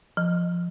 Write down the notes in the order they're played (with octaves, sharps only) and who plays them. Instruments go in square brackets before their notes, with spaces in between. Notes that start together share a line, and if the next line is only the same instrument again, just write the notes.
[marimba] F3